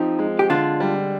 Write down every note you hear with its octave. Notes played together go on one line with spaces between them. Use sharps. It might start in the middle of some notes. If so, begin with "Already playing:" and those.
Already playing: F3 C4 D#4 G4
G#3
G4
D3 D4 F4
G3